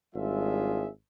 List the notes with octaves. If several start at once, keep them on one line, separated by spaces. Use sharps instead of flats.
G#1 G3 D4 F4 G#4 E5